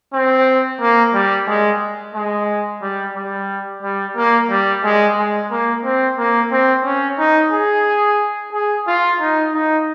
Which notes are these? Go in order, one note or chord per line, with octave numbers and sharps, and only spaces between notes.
C4
A#3
G3
G#3
G#3
G3
G3
G3
A#3
G3
G#3
G#3
A#3
C4
A#3
C4
C#4
D#4
G#4
G#4
F4
D#4
D#4